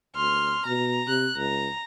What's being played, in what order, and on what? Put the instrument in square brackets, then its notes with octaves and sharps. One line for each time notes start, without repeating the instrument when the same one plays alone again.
[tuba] D2 [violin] C6 F6
[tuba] B2 [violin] A#5
[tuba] C3 [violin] F#6
[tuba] C#2 [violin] A#5